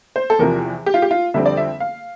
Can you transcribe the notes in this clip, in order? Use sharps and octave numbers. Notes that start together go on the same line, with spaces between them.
C5
A4
E2 C3 F3 A#4
G4
F4
G4
F4
F2 D3 G3 C4 E5
D5
E5
F5